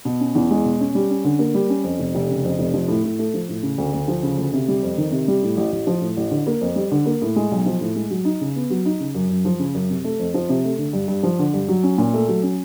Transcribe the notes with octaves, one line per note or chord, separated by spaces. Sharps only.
B2
C#4
E2
G#3
B2
C#4
G3
C#4
D3
A#3
G3
C#4
F2
F1
F1
C#3
F2
F1
F3
A2
A2
A3
F3
A2
C#3
D2
D2
F3
C#3
D2
C3
G3
F2
D#3
C3
G3
A2
A1
A1
F3
A2
A1
D3
A#3
F2
G3
D3
A#3
A2
G#3
B1
F3
A2
G#3
F#3
D#4
C#3
B3
F#3
D#4
C#3
F#2
F#2
F3
C#3
F#2
C3
A3
F2
F3
C3
A3
D3
G2
G2
F3
D3
G2
F#3
C#4
A#2
A3
F#3
C#4